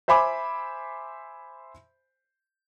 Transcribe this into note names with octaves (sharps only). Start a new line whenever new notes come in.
C5 E5 G#5 B5 D6